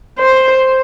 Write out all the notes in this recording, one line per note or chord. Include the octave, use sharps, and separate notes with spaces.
C5